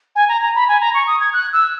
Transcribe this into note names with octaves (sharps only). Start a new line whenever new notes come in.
G#5
A#5
A#5
B5
G#5
A#5
C#6
D#6
G#6
F#6
E6